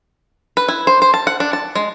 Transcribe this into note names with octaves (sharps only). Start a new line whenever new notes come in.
B4
E4
C5
C5
A5
F#5
D4
A5
G#3